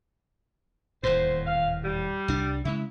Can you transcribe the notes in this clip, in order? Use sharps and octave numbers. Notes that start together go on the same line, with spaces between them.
D#1 E2 A2 C5
F5
G3
C2 D4
C#3 G#3 E4